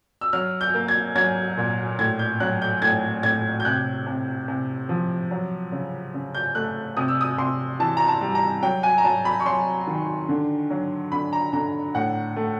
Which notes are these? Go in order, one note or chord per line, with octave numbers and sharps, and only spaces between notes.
E6
F#3 F6
G6
A#3
G#6
F#3 G#6
A#2
A2 G#6
G6
F#3 F#6
G6
A2 G#6
A2 G#6
G6
C3 F#6
C3
C3
F3
F#3
C#3
C#3
G6
A3 F#6
C3 D#6
E6
D#6
C3 C6
E3 A5
A#5
A5
G3
A#5
F#3 G5
G#5
A#5
F#3 A5
B5
C#6
F#3 C6
D#3
D3
F#3
D3 B5
A#5
D3 A#5
A2 F#5
A3